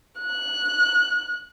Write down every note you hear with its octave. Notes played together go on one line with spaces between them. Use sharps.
F#6